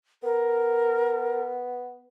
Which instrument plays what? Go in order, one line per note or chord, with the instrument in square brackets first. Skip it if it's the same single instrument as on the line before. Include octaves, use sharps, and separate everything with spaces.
[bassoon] B3 [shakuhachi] A#4